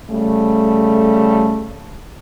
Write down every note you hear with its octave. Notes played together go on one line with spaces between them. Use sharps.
C#3 G3 A3